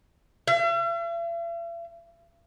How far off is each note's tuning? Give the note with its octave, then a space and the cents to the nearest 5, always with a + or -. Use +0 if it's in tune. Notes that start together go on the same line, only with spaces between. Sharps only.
E5 +45